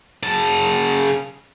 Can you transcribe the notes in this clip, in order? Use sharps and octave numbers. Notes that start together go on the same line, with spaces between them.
C#3 A5